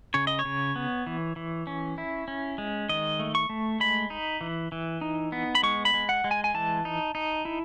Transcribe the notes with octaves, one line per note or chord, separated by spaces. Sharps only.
C#3 C#5
D#5
C#5
C#3
B3
E3
E3
C#4
E4
C#4
G#3
D#3 D#5
A3
C#6
A3
G#3 B5
D#4
E3
E3
D#4
B3
B5
G#3 C#6
B5
G#3
F#5
G#3
G#5
G#5
E3 A5
D#4
D#4
E4